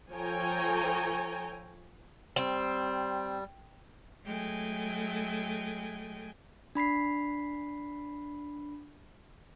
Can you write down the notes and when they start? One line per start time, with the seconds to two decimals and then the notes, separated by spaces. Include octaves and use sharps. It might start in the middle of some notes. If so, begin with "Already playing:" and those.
0.11 F3 A4 C#5 G5 G#5 A#5
2.36 G3 C4
4.24 F#3 G#3 A3 G5 G#5
6.75 D4 B5 B6 C7